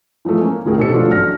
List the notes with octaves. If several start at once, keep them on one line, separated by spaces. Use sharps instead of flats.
E3 F3 G#3 A3
A#3 C#4
D2 A2 G#4 A#4 G5
B2 D#3 G4 A4 C5 C#7
F3 A3 D4 F4 F#4 A4
A1 F#2 A3 D4 F6 A#6